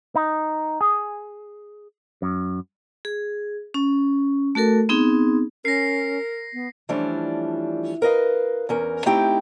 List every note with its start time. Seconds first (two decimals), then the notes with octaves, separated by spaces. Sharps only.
0.15 D#4
0.81 G#4
2.22 F#2
3.05 G#4
3.74 C#4
4.55 A3 F#4 A4 A#4
4.89 B3 C4 D#4 G#4
5.65 C#4 A#4 A#6 C7
6.53 B3
6.89 E3 F3 G3 A3 C#4 D4
8.02 A#4 B4 D#5 F5
8.69 E2 C#4 A#4
9.06 A3 C4 D#4 E4 G4 G5